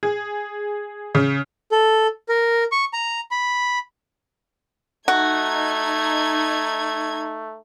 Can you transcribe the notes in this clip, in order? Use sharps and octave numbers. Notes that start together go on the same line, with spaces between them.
G#4
C#3
A4
A#4
C#6
A#5
B5
A3 D#4 F#4 G#6